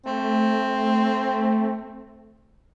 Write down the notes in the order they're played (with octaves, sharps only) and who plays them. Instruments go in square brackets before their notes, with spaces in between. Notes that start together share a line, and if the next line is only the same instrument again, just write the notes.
[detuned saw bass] A3 [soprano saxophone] C4